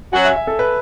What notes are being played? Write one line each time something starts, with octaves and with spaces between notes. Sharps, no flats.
F#3 C#4 F#4 G#5
E5
E5
A4
B4